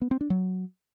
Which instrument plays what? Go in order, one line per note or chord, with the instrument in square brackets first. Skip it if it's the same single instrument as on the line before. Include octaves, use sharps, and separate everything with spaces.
[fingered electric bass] B3
C4
D4
F#3